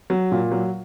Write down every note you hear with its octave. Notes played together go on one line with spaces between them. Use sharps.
F#3
A#2
F#3